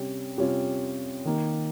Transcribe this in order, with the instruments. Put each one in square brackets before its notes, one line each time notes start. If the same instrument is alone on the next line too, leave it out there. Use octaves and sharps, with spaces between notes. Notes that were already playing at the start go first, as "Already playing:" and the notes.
Already playing: [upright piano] C3 G3 C#4
C3 G3 C#4 F4
D#3 A#3 D#4